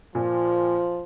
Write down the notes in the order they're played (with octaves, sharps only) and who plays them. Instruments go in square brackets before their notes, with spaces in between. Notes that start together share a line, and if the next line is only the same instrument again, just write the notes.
[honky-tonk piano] A#2 [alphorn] F3